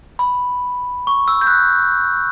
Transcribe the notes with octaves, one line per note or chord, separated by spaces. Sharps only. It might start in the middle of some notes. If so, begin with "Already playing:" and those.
B5
C#6
E6
G6
F#6